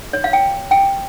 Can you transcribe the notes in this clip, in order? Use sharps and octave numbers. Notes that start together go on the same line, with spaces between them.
C#5
F5
G5
G5